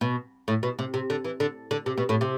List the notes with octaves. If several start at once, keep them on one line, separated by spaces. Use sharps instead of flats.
B2
A2
B2
C3
C3
D3
E3
D3
D3
C3
B2
A2
C3